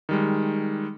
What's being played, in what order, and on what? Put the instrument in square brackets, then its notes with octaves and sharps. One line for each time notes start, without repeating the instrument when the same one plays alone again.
[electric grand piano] D#3 G3 G#3